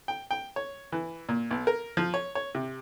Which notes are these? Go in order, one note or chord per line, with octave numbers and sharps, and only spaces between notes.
G5
G5
C#5
E3
A#2
B1
A#4
F3
C#5
C#5
C3